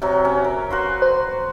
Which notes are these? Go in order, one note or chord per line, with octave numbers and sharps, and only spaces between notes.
C3 F#3
C#4
A#4
F#4 B4 C6
C5